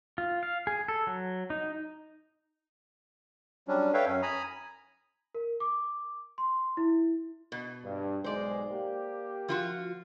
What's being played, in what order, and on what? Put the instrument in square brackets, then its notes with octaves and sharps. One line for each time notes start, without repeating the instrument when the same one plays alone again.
[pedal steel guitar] F4
F5
G#4
A4
F#3
D#4
[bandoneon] F#3 G3 C#4 D4
A4 B4 C#5 E5 F5 G5
F#2 C#4
G#5 A#5 B5 D#6
[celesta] A#4
D6
C6
E4
[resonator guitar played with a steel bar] B2
[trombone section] G2
[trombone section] B1 G#2 G#3 [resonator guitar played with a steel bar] C5 D5
[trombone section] A#3 G4
[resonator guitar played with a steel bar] F3 F4 F#4